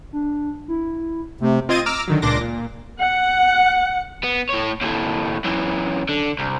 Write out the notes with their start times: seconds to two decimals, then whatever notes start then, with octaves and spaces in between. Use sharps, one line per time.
0.13 D4
0.68 E4
1.41 C3 A3
1.69 C4 F4 D#5 G#6 A6 D#7
1.86 A#5 D6 E6 F6
2.08 D3 D#3 F#3
2.22 C#2 A#2 D4 C6 D6 A#6
2.41 A#2
2.99 F#5
4.24 B3
4.50 A2 C#5
4.82 D#2 A2
5.44 F#2 E3
6.09 D3
6.39 C2